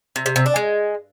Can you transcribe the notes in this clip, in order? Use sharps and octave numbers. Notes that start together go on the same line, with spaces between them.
C3
C3
C3
D4
G#3